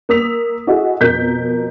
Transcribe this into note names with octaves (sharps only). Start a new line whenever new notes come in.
A#3 D#6 E6 B6 F7
E4 F#4 G#4 A4 D#5
F2 B2 A#4 G6 B6